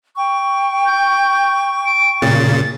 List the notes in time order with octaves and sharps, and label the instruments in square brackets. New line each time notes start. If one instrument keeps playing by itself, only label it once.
[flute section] G5 C#6
[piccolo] G6
D7
[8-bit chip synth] A#2 C#3 [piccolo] A6